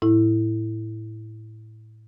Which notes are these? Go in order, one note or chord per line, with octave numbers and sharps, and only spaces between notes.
A2 E4